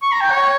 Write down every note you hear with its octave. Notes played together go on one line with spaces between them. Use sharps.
C#6
A#5
G5
C#5